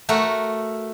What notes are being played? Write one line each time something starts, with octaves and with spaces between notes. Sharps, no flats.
A3 F#4 A#4